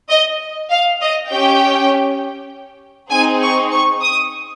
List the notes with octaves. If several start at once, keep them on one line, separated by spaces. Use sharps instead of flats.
D#5
F5
D#5
C#4 G4 G5
C4 D#4 G#4 G#5
C#6
C#6
D#6